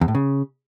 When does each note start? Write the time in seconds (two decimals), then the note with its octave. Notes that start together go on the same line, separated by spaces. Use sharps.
0.01 E2
0.08 A2
0.15 C#3